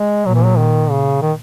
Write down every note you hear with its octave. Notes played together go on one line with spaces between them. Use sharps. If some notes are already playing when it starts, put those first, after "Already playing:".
Already playing: G#3
A#2 F#3
E3
F#3
D#3
C#3
D#3